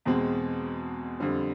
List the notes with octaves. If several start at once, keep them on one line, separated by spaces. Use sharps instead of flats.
E2 B2 G#3 C4
F2 D3 G3